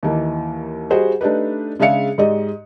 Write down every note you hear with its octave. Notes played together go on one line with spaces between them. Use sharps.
D#2 D#3 E3 A#3
G3 F#4 G#4 C5 D#5
A3 D4 D#4 G4 B4
C#3 G#3 D4 E5 F5 C#7
G#2 G#3 G4 D5 D#5